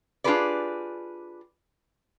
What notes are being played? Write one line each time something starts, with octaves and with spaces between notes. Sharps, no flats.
D4 F4 G4 G#4 B4 D5